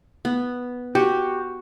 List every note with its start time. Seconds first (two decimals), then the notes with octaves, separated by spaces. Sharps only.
0.25 B3
0.95 F#4 G4